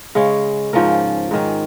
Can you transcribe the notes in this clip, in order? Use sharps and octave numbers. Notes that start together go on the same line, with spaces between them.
C#3 G#3 C#4
G#2 F3 C#4 A#4
G#2 D#3 C#4